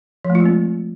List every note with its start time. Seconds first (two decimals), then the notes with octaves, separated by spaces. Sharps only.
0.25 F3
0.30 A3
0.35 F4
0.40 G#3
0.45 C4